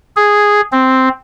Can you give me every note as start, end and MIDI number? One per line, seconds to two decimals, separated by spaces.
0.17 0.61 68
0.72 1.09 60